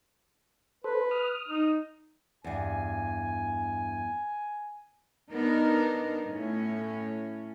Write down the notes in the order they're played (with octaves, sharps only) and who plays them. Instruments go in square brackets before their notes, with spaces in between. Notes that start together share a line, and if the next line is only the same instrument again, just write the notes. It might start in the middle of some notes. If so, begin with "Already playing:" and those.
[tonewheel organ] A4 C5 [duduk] B4
[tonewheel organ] D#6 F6
[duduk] D#4
[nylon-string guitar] E2 G2 [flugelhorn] G#5
[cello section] B3 D4 D#4 A#4
A2 C#4